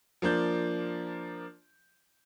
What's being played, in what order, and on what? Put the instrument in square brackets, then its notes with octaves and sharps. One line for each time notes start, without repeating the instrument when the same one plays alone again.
[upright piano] F3 A#3 D4 G6